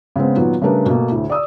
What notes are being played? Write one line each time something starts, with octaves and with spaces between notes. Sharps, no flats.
C#3 G#3 B3 C4
A#2 D#3 F#3 B3
C#3 G3 A3 D4 A#4 B4
B2 A3 A#3
D2 A2
D5 D#6 E6